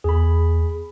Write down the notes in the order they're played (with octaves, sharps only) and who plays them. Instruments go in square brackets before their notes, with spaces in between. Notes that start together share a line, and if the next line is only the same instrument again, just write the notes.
[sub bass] E2 [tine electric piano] G#4 B5